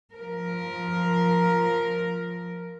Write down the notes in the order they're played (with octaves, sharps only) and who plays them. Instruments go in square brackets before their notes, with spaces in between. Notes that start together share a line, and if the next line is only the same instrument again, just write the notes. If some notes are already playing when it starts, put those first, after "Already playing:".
[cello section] F3 A#4